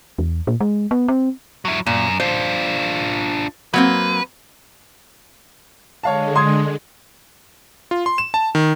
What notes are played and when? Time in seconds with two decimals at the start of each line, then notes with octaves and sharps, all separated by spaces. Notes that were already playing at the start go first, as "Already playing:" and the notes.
0.19 E2
0.47 A#2
0.60 G#3
0.91 B3
1.08 C4
1.65 F#3 E4
1.87 F#2 A#2
2.20 D4 F4 C5
3.74 F#3 A#3 C4 B4
6.03 D3 G#3 C#5 F5 A5
6.35 C6 D#6 G#6
7.91 F4
8.06 C6
8.18 E7
8.34 A5
8.55 D#3